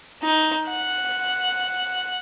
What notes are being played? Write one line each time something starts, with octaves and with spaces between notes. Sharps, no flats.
D#4
F#5